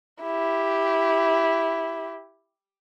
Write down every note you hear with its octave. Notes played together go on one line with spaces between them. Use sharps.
E4 G4